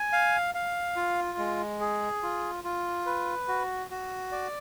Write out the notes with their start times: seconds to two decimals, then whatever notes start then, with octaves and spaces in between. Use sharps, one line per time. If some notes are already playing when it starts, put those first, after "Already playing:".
Already playing: G#5
0.13 F5
0.55 F5
0.96 F4
1.38 G#3
1.80 G#4
2.23 F4
2.64 F4
3.06 B4
3.48 F#4
3.90 F#4
4.32 D5